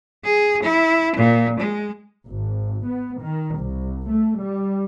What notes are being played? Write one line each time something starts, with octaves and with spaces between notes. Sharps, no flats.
G#4
E4
A#2
G#3
G#1
B3
D#3
C2
A3
G3